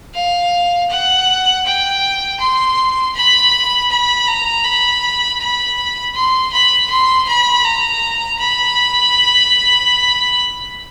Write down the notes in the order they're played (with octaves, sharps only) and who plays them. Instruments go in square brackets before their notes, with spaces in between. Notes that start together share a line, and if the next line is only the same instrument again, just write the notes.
[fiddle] F5
F#5
G5
C6
B5
B5
A#5
B5
B5
C6
B5
C6
B5
A#5
B5